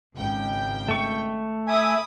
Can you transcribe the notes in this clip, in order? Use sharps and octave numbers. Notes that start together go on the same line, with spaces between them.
G#1 C#2 G5
A3 C#6
E5 G#5 B5 D6 D#6